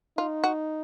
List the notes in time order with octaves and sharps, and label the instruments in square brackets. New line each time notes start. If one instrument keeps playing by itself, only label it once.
[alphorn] D#4 [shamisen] F4
[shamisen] F#4